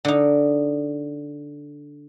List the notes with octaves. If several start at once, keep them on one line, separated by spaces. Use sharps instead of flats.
D3 D#4